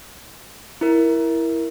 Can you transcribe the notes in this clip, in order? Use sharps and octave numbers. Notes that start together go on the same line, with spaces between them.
E4 A#4